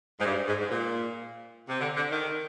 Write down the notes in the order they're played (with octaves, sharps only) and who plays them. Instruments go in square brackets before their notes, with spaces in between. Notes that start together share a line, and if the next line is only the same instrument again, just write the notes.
[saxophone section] G#2
G2
G#2
G#2
A#2
C3
D3
D3
D#3